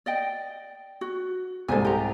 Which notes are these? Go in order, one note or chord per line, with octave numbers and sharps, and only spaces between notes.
D5 D#5 G5
F#4
C2 G#2 A4 C5 G#5
G4 A#5